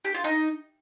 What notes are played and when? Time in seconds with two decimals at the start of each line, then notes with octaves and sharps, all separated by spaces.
0.05 G4
0.14 F4
0.24 D#4